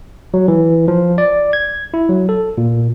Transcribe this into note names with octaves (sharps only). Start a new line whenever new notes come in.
F#3
E3
F3
D5
G#6
E4
F#3
A4
A#2